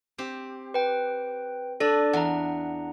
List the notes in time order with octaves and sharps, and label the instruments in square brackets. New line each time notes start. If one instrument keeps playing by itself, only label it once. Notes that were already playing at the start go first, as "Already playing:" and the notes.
[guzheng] C4 G4
[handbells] B4 G5
[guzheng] D4 [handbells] A4 D5
[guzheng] E2 [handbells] F#5 A#5